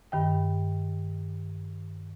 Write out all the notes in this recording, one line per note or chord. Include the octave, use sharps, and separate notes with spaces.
G2 D#3 G5